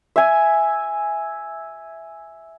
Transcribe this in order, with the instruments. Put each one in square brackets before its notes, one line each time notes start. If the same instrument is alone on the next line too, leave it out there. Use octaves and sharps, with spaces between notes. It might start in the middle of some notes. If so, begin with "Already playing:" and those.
[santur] E5 G#5